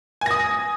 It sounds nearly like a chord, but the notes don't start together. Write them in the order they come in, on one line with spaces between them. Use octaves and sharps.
G#5 A#6 D#6